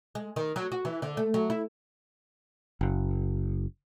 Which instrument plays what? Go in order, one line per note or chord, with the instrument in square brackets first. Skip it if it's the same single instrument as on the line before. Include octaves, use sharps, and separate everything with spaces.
[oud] G#3
D#3
F#3
F#4
E3
D3
A3
F#3
E4
[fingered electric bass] F#1